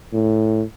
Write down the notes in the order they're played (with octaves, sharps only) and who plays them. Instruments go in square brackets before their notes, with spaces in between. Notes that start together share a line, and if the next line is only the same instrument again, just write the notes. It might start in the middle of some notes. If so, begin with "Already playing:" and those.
[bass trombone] A2